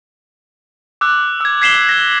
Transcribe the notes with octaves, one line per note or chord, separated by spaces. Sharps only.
D6 E6 F#6
E6 G#6
G#6 B6 C7 E7 F#7 G7
A#6 E7